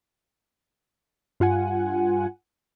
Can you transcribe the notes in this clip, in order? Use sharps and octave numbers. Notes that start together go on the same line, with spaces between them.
G2 F4 F#5 G#5